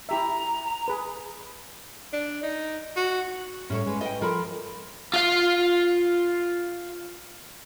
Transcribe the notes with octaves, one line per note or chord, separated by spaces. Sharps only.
E4 G4 E5 A#5
G#4 B4
D4
D#4
F#4
A2 G3 C#4 A4 C#5
G#3 B4
B4 D#5 G5
F3 A4 A#4 B5
F4 F5